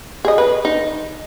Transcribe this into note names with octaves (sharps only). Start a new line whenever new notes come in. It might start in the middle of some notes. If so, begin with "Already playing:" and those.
G#4 D#5
B4
D#4